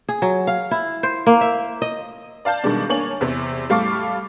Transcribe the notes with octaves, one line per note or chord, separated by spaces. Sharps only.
G#4
F#3
F5
E4
C5
A#3
E5
D#5
D5 F5 A5 G6
B2 D#3 G3 G#3 D4
A#3 D4 C#5 G#5 F#7
E2 C3
A2 G3 A4 F5 C#6 D6